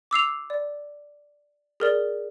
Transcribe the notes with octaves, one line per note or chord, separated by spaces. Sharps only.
D6 E6 C7 F7
D5
G#4 A#4 D5